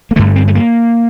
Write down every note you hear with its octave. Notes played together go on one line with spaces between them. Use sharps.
A#3
G2 D3 A3
C4
A3
A#3